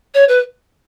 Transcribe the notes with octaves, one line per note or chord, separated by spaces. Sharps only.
C#5
B4